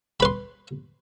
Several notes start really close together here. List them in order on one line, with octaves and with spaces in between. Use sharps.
B5 B4 C6